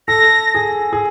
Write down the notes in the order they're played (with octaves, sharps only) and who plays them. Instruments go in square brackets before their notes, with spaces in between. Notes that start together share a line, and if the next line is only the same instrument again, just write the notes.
[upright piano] A4 [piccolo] A#6
[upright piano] G#4
G#4